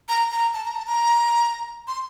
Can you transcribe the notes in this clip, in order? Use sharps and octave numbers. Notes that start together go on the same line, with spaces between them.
A#5
A#5
A5
A#5
A5
A#5
C6